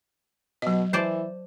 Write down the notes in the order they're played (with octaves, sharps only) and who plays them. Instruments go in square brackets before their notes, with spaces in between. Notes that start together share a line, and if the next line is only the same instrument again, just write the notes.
[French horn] B2 [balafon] F#3 D#5
[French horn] E3 [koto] C5 D5 A5